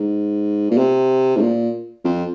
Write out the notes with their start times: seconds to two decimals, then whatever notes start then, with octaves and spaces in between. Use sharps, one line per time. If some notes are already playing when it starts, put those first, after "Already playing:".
Already playing: G#2
0.71 A#2
0.77 C3
1.36 G#2
1.41 A#2
2.05 F2